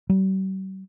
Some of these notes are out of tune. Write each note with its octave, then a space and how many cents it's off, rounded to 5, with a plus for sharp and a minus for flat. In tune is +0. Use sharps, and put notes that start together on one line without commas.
G3 -45